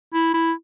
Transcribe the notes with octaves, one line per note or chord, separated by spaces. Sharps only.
E4
E4